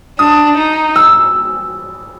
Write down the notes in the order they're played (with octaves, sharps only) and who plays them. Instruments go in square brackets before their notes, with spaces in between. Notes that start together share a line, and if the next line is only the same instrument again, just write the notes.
[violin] D4 [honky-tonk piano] D#6
[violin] D#4
[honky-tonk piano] E6